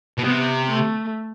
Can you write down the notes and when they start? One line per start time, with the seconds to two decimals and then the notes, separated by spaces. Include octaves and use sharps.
0.18 B2
0.24 C3 B3
0.68 A3